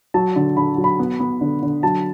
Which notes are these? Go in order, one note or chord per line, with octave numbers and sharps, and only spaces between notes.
F#3 A5
D3
D3 B5
F#3
B5
B3
B3
D3
D3
F#3 A5